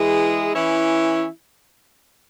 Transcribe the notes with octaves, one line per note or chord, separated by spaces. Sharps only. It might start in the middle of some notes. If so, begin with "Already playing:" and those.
Already playing: E3 G#3 E4 G#4
E3 C#4 E4